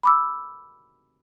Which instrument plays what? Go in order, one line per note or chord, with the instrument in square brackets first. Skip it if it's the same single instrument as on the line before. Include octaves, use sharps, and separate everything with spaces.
[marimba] B5 D6 E6